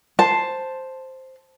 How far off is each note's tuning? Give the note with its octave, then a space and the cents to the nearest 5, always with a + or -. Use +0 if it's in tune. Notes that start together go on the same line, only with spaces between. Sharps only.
C5 +0 A5 +0